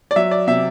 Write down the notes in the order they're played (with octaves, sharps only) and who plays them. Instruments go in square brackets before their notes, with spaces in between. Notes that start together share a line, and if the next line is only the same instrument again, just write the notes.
[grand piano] D5
F#3 E5
D5
C3 E5